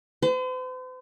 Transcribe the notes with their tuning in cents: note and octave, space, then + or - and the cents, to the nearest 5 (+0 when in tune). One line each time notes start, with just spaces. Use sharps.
C5 -45